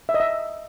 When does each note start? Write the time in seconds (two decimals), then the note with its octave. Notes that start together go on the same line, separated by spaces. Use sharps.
0.09 E5
0.14 D#5
0.20 E5